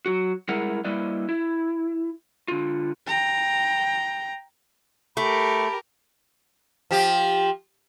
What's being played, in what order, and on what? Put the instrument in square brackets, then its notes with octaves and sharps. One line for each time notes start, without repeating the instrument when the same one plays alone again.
[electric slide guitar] F#3 F#4
G3 G#3 E4 G#4 A#4 F#5
G3 A#3 E4 B4 D5 D#5
E4
D3 F4
[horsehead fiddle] G5 A#5
[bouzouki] A3 [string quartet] G4 A#4 [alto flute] B5
[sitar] F3 G4